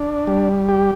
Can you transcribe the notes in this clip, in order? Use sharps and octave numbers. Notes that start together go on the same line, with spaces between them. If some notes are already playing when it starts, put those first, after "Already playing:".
Already playing: D4
G3
G4